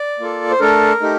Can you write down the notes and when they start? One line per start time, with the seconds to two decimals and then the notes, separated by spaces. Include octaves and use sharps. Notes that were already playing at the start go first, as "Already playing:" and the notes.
Already playing: D5
0.19 A#3 F4 A4
0.51 C5
0.60 A3 D4 A4 A#4
1.01 A3 D#4 G4